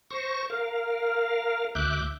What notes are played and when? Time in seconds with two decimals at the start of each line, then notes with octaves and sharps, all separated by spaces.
0.11 C5 C#6 A#6
0.50 A#4 F5
1.75 D2 E5 D6 F#6 G6